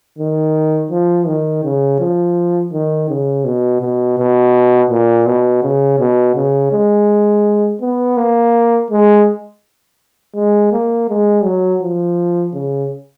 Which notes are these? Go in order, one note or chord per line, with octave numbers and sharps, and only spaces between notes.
D#3
F3
D#3
C#3
F3
D#3
C#3
B2
B2
B2
A#2
B2
C#3
B2
C#3
G#3
B3
A#3
G#3
G#3
A#3
G#3
F#3
F3
C#3